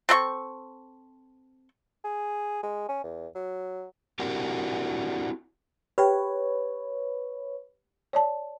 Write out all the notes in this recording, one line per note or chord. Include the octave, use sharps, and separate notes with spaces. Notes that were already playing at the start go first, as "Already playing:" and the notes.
C4 A4 E5 C#6
G#4
G#3
C#4
E2
F#3
C4 D4 E4 F#4 G4 A#4
G4 B4 C#5 G5
C#5 D5 A5